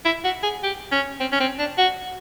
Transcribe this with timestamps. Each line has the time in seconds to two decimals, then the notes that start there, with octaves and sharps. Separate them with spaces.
0.05 E4
0.24 F#4
0.43 G#4
0.63 G4
0.92 C#4
1.20 C4
1.32 C#4
1.40 C4
1.59 D4
1.78 F#4